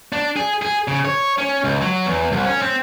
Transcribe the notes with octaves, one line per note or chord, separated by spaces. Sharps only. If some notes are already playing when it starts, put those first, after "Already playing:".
D4
G#4
G#4
C#3
C#5
C#4
C#2
F#3
E2
C2
C#4
C4